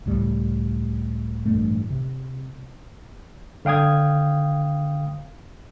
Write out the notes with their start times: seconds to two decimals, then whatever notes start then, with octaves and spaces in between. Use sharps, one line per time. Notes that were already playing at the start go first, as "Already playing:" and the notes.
0.06 C#2 A2 G3
1.45 A1 G2 A#2 A3
1.90 C3
3.65 D3 F5 G5 D#6 G#6